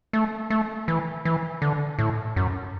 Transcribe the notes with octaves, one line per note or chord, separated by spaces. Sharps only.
A3
A3
E3
E3
D3
A2
F#2